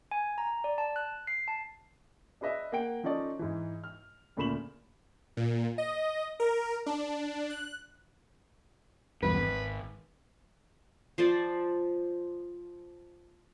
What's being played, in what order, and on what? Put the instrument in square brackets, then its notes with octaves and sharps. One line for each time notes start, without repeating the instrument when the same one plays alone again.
[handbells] G#5
A#5
D5
A5
F#6
C7
A5
[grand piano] D4 G#4 B4 D#5 E5
A#3 F#5 G5 D7
F3 C#4 D#4 A4 D5 D#5
G#2 E3
F6
D2 A#2 C#3 B5 E7 F#7
[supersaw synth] A#2
D#5
A#4
D4
F#6
[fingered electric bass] B1 E2 G2 [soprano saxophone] B4
[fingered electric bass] G#1
[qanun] F3 C5 D5